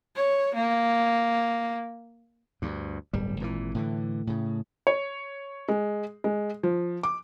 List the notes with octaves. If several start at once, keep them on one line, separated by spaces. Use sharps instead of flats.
C#5
A#3
D2 G2
D1 G1 G3
G#1 A#2 D#3 E3
A2 D3 E3
A2 C#3
C#5
G#3
G#3
F3
D6